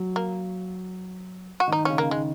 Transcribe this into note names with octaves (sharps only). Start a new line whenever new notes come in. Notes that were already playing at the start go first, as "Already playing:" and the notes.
Already playing: F#3
A#3
F#4
D#3 D#4
C#3 C#4
A#3
D#3 G#3